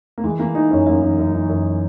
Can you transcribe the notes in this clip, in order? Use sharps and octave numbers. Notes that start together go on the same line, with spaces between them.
A#3
E3 G#3
E3 A#3
E3 D#4
F#2 C#4
F#2 A#3
E3
F#2
E3
F#2